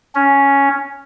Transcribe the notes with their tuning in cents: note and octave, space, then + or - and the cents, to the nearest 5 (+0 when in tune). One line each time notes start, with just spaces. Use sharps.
C#4 +5